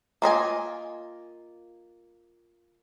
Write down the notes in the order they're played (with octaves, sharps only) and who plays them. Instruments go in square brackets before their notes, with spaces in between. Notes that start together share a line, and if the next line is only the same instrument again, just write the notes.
[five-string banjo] A#3 F4 D#5 G#5